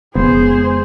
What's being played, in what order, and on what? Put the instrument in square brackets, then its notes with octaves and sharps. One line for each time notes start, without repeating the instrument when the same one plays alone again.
[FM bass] E1 [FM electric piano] F2 C#3 G#3 [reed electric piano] B3 [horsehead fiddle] G#4 C5